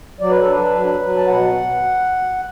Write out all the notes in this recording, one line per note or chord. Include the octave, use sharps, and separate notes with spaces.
F#3 D5
B4
A4
D4 B4
F#3
F#3
A5
B2 F#5